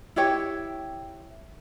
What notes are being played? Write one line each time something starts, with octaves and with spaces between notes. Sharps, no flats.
E4 G4 C#5 G5